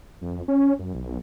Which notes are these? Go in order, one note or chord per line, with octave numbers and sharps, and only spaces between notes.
F2
C#4
F#2
B1